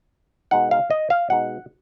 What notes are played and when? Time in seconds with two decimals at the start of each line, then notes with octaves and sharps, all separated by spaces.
0.51 B2 G#3 D#4 F#5
0.71 F5
0.90 D#5
1.10 F5
1.30 B2 G#3 D#4 F#5